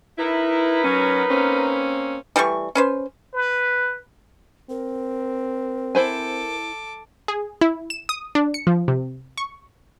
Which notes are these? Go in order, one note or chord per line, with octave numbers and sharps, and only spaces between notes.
D#4 E4 A#4 B4
F#3 C#4
A#3 C4 C#4
E3 G3 A3 C#6
C#4 B4 C5
B4
C4 A#4
E4 A4 C5 G#5 D6
G#4
E4
E7
D#6
D4
C#7
F3
C3
C#6